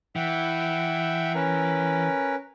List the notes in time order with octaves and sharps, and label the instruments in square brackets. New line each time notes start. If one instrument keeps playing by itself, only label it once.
[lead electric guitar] E3 [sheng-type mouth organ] E5 F#5 G5
[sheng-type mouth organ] C#4 A#4 B4